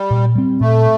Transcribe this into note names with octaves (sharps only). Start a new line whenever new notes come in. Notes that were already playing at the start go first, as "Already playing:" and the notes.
Already playing: G3
A#2
G3 C4
A#2 A3